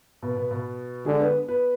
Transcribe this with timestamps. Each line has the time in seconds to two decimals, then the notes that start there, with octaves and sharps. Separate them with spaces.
0.22 B2 B3
0.36 B2 B3
0.50 B2 B3
1.06 D3 G#3 G#4
1.20 B3 B4
1.48 B3 B4